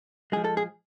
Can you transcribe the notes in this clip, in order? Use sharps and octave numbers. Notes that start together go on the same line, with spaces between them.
F3 G#3 G#4
A4
G#4